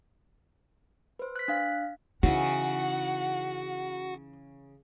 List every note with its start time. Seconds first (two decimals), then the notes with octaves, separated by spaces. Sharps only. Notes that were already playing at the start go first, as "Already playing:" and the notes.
1.19 B4 C5
1.36 F#6 B6
1.48 D4 F5
2.23 C#3 E3 D#4 F#4 F#5